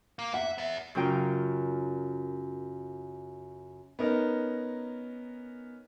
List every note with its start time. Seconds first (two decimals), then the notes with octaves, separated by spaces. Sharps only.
0.19 A#3
0.34 E5 F#5
0.58 B3 E5
0.95 F#2 C#3 C#4 F4 A#4 G5
3.99 B3 C#4 D#4 A#4